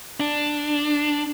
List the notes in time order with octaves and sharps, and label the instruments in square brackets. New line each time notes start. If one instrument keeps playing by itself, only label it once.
[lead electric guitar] D4